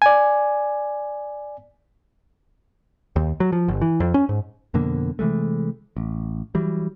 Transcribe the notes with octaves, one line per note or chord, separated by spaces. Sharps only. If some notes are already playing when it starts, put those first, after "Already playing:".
D5 G#5
D#2
F#3
F3
G1
E3
F2
C#4
G#2
F2 B2 D3 A#3
C3 E3 G#3 A3
A1
E3 F#3 G3